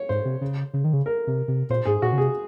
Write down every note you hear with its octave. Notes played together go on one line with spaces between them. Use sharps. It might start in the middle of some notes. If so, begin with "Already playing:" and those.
Already playing: C#5
G#2 C5
C3
C#3
C#3
D#3
C#3
A#4
C3
C3
A#2 C5
G#2 G#4
A#2 F#4
C#3
C3 G#4